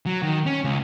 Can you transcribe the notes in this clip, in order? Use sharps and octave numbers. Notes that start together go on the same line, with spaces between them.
F#3
D#3
C#4
C#2